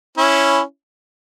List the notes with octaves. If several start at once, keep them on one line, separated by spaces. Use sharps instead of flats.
C#4 E4